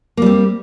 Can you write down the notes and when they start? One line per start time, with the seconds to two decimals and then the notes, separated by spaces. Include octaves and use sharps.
0.17 A#3
0.22 G3
0.26 C4